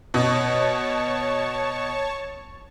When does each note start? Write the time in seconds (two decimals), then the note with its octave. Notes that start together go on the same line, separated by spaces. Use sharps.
0.14 B2 C#5 A5 C#6